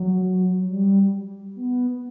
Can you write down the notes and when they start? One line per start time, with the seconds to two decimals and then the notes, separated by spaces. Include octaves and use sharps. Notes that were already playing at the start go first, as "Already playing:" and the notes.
Already playing: F#3
0.69 G3
1.56 B3